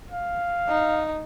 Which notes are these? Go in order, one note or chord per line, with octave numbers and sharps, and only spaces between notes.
F5
D#4